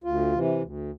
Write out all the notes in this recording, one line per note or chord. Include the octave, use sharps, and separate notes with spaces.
D2 F4
C3 E3
D2